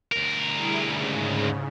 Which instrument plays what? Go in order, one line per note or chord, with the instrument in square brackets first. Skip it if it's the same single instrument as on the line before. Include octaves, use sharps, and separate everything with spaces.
[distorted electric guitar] D2 A#4
[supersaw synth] G3 E4 G#4
G#2 C#3